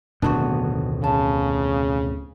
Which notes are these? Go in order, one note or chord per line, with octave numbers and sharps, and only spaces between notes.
D1 F2 B2 D#3 B3 D4 E4 F#4
C#3 A5